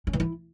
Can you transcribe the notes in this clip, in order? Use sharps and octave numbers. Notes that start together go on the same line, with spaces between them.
C#4
E3
E4